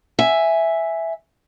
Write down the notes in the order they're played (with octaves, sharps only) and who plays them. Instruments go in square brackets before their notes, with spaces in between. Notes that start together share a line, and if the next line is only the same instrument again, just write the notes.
[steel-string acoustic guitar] E5 G#5